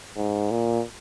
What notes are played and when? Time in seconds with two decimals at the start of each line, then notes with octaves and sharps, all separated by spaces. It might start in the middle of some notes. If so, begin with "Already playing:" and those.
0.17 G#2
0.51 A#2